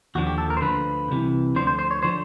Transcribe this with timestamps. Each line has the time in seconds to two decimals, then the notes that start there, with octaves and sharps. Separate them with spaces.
0.15 D#2 D3 F3 F#4
0.27 G4
0.38 A4
0.50 A#4
0.57 C5
0.61 D2 D3 F3 B4
1.08 C2 C3 E3
1.56 D2 D3 F3 C5
1.67 C5
1.79 C5
1.91 C#5
2.03 D3 F3 C5